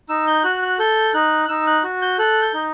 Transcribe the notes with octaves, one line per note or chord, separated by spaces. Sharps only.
D#4 E6
G6
F#4 F#6
F#6
A4 G6
D#4 F#6
F#6
D#4 E6
F#6
F#4
G6
A4 F#6
G6
D#4